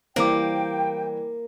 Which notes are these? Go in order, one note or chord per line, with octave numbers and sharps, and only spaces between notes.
E3 G3 A#3 C5 G5 D6